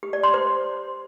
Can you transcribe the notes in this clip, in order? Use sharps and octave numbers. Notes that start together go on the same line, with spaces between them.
G4
D5
C6
C5